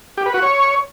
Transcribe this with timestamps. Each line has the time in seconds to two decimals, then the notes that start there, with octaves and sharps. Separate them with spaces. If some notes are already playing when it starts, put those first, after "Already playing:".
0.18 G4
0.26 B4
0.34 F#4
0.42 C#5